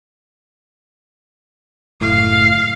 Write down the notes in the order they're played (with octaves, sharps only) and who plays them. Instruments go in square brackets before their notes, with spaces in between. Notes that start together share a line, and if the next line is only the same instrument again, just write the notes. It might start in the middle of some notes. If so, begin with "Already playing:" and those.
[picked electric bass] F#1 A2 [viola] F5